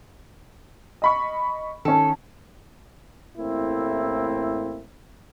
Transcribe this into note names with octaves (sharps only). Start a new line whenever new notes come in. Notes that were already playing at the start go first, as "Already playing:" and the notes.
D#5 B5 C#6
D#3 C#4 A4
A1 A2 A#3 C4 E4